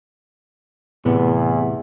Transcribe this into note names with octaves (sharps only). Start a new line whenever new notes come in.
E2 A2 C3 B3